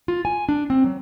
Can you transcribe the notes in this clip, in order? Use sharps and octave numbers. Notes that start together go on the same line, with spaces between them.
F4
G#5
D4
C4
F#3